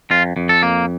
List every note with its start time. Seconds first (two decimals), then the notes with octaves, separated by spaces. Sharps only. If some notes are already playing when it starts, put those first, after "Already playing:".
0.11 F2 F4
0.37 F2
0.49 A4
0.63 A#3